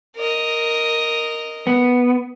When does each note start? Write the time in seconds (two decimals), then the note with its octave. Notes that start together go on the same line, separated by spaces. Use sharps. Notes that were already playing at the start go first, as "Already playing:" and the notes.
0.16 A#4 D#5
1.67 B3